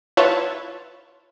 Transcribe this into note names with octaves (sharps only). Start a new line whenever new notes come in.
E4 F4 B4 C#5 A5